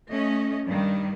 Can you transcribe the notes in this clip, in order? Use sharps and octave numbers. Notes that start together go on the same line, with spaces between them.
A3 C#4 D#5
G2 D#3 G3